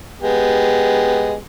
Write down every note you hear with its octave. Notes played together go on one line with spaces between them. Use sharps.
G#3 B3 G4